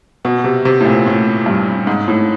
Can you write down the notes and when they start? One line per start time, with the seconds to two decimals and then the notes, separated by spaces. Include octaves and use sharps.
0.25 B2
0.44 C3
0.65 C3
0.81 A2
0.85 A#2
1.06 A2
1.46 G2
1.87 G#2
2.08 A2